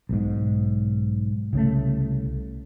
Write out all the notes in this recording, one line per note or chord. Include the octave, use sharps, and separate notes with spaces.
B1 G#2
C2 C#3 A3